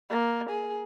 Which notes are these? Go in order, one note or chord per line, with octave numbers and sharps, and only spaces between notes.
A#3
G#4